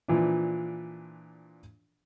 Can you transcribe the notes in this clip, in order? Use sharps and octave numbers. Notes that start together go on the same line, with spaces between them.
A#2 E3 F3 D4